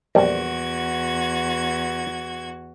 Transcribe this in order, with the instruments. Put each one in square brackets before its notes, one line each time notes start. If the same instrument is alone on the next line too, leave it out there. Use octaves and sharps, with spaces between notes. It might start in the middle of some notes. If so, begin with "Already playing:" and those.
[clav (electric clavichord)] A#1 G3 [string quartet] E2 F#4 G#6